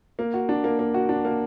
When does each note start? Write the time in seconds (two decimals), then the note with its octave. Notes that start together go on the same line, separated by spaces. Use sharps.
0.19 A#3
0.34 F#4
0.49 D4
0.64 A#3
0.79 A#3
0.94 F#4
1.09 D4
1.25 A#3